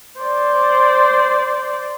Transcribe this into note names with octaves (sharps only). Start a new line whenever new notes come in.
C5 D5